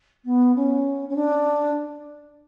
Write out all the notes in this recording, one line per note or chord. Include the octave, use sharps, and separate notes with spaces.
B3
C#4
C#4
D4